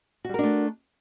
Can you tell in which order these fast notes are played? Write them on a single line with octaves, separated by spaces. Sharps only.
F#4 G3 A#4 D4 A3